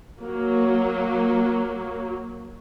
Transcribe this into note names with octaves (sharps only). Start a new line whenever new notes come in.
F#3 A#3